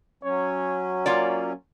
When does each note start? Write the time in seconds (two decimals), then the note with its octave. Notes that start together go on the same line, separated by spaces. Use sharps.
0.23 F#3 C#4 C#5
1.06 A#3 F4 C#5 D5